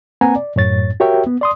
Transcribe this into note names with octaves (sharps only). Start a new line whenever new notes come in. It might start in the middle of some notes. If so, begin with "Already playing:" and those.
A#3 C4 B4 F#5 G#5 A#5
D5
F#2 A2 C#5 A6
F#4 G4 A#4 C#5 E5 G5
B3
D5 C6 D#6